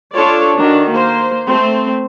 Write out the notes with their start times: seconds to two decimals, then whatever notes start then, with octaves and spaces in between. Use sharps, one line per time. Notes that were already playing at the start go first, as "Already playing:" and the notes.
0.14 D4 F4 A4 C#5 D5
0.57 D#3 D4 F#4
0.90 A#3 C5
1.47 A3 C4 C5